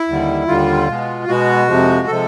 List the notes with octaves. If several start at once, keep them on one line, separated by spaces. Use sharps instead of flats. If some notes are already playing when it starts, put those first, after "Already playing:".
Already playing: E4
D#2 D3 G3
D#2 D3 G3 F4
B2 G#3 B3
B2 G#3 B3 F#4
F2 C3 F3 G#3
C3 F3 G#3 A4